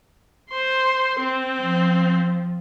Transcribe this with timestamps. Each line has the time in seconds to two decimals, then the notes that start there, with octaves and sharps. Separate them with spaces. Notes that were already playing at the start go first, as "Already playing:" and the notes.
0.50 C5 C6
1.19 C4
1.60 F3